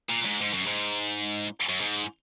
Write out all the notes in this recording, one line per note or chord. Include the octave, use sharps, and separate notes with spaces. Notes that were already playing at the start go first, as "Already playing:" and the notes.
A#2
G#2
G#2
F#2
G#2
F#2
G#2